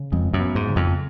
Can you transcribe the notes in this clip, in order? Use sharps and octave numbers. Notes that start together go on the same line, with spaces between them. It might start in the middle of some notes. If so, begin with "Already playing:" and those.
Already playing: C#3
F2 G#3
F#2
B3
G#2
C#3
F2